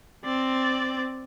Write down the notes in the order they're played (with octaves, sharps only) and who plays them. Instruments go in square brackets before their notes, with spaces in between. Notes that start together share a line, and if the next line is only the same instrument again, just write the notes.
[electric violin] C4 D5